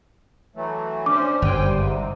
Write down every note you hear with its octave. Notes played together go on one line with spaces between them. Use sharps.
E3 F#3 A3
C#4 D4 C5 D6
G1 F#2 G3 C5 G5 G#5
G#2 C3